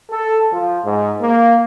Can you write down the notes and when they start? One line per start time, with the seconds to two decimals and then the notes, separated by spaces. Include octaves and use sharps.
0.11 A4
0.53 F3
0.85 G#2
1.22 A#3